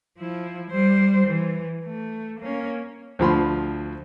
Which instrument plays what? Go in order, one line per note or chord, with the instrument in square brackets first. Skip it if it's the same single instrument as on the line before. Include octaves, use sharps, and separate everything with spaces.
[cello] F3 E4
G3 C5
E3
A3
A#3 C#4
[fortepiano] D2 F3 B5 C6